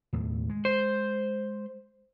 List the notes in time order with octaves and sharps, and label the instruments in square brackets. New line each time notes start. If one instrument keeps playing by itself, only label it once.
[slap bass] D#2 A2
G#3
[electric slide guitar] C5